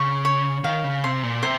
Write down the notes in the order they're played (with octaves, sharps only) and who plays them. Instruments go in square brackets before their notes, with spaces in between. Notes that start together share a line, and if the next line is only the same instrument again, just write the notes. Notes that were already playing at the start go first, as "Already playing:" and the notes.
Already playing: [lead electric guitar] C#3 [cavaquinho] C#6
[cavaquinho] C#5
[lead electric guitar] D#3 [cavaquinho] F5
[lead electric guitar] C#3
[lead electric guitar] C3 [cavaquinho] C6
[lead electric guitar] A#2
[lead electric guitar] C3 [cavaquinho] C5